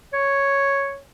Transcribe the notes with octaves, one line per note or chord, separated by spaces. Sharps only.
C#5